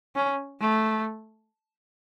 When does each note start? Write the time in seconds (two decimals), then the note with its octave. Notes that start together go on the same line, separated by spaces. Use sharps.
0.15 C#4
0.61 A3